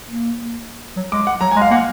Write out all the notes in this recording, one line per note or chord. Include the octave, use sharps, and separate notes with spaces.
A#3
F#3
G#3 D6
F#5
F#3 A#5
G#5
G#3
F5
A#3 F#5